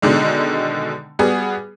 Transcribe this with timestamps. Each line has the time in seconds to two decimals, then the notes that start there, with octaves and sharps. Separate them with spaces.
0.02 B2 D3 D#3 G#3
1.19 G3 B3 F#4 G#4